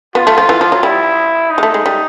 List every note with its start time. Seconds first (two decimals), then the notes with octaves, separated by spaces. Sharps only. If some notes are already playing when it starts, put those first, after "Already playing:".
0.15 B3 F4
0.27 A3
0.38 F3
0.49 E3
0.61 F3
0.72 F#3
0.83 G3 E4
1.51 D#4
1.58 G#3
1.63 A3
1.74 G#3
1.86 G3